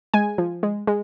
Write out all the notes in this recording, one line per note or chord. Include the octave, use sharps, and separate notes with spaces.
G#3 G#5
F3
G#3
G#3